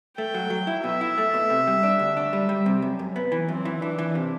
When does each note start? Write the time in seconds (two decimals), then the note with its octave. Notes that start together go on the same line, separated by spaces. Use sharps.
0.17 A3 G5
0.34 F#3
0.50 F#3
0.67 E4
0.84 B2 E5
1.01 E4
1.18 A3
1.34 B2
1.50 C3
1.67 G3
1.83 D4
1.99 D2
2.17 D4
2.33 G3
2.49 G3
2.66 C3
2.82 F#2
2.99 F#2
3.16 B3
3.32 E3
3.48 F#2 C4
3.65 E3
3.82 E3 D4
3.99 E3
4.15 C3